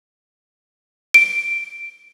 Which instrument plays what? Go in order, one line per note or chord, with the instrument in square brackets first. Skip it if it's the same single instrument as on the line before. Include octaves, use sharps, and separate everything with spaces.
[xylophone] D7